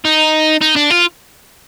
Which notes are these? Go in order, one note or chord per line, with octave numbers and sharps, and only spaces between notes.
D#4
D#4
D4
F4